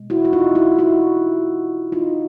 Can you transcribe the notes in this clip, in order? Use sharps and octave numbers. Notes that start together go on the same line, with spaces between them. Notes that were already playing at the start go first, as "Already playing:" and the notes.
Already playing: B2 G#3
E4 F#4
F#4
D#4 F4
E4 F#4
E4 F#4
D#4 F4